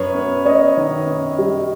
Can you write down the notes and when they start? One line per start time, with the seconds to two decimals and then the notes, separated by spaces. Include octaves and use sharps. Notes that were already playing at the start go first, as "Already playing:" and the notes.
Already playing: F#2 B4 C#5
0.15 B3
0.45 B3 C#5 D#5
0.77 D#3
1.07 B3
1.39 G3